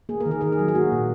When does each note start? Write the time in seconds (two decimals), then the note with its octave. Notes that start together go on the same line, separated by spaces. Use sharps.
0.09 A#3 G#4
0.20 A#4
0.26 D#3
0.31 G#4
0.41 D#3 A#4
0.52 G#4
0.59 F#3
0.68 G#4
0.75 A#3 F#4
0.92 A#2